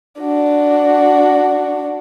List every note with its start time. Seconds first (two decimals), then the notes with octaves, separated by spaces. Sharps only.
0.20 D4 F#4